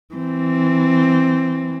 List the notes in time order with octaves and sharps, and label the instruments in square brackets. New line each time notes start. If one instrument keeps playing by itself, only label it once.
[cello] E3 C4